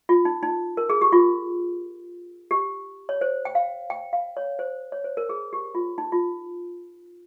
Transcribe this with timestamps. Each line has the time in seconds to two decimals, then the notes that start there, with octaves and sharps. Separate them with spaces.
0.09 F4
0.25 D#4
0.43 D#4
0.77 A#4
0.90 G#4
1.01 G4
1.12 F4
2.51 G4
3.09 C#5
3.21 C5
3.45 G5
3.55 F5
3.90 G5
4.13 F5
4.37 C#5
4.59 C5
4.92 C#5
5.04 C5
5.17 A#4
5.29 G#4
5.53 G4
5.75 F4
5.98 D#4
6.12 F4